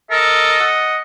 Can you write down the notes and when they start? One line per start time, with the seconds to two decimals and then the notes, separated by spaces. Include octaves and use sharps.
0.11 A4 A#4 D#5
0.60 F#5